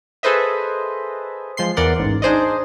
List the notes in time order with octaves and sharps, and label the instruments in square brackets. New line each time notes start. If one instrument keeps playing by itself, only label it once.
[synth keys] G#4 A4 B4 C5 D#5 E5
F3 G#3 C6 C7
E2 E3 A#4 D5 F#5 C6
A1 G#2
D4 D#4 G#4 C5 D5 D#5